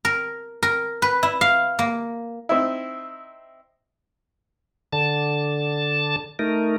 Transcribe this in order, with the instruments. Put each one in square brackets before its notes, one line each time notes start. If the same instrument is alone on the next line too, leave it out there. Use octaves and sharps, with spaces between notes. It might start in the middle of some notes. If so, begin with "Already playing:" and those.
[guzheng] A#4
A#4
B4
E4
F5
A#3
[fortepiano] C4 D#4 E4
[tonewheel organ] D3 A5
A3 D#4 A#4